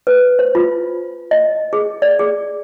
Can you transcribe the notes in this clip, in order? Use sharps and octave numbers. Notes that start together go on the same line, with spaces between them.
B4
C5
F4
D#5
G#4
D5
G#4